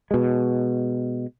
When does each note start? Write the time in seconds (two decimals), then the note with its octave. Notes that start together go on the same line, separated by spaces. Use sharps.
0.11 B2 G#3